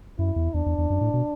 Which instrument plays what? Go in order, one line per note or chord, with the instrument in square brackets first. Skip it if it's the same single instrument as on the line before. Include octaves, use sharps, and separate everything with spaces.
[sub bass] F#2 [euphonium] E4
[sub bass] E2
[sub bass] E2 [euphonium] D4
[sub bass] E2
E2
F#2
A2
B2